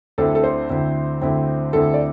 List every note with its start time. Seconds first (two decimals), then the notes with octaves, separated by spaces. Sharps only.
0.18 D2 D3 C4 E4 A4
0.35 A4
0.44 C5
0.70 D2 D3 C4 E4
1.21 D2 D3 C4 E4
1.73 D2 D3 C4 E4 A4
1.94 D5